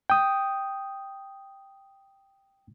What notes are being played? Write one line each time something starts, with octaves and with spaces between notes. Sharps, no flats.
G5 D#6